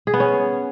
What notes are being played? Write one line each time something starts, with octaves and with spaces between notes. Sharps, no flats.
G#4
B3
C#4